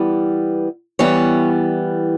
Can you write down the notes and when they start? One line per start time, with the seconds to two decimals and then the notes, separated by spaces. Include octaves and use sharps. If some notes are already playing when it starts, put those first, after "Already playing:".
Already playing: E3 G3 B3
0.99 E3 G3 B3 C#5